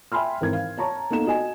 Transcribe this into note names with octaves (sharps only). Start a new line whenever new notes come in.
E5 G5 G#5 B5 C6 F6
G#1 E3 A#4 G#6
F5
C#5 A5 A#5 C#6
A#3 B3 D#4 A4 E7
F#4 D#5 G#5